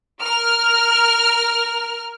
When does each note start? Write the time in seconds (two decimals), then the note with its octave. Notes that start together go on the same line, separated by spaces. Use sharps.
0.21 A#4 F6